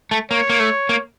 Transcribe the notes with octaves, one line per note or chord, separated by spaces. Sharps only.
A3
A#3 C#5
A#3
A3
A#3